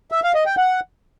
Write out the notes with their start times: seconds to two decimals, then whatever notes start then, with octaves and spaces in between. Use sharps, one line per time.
0.12 E5
0.23 F5
0.35 D#5
0.46 G5
0.57 F#5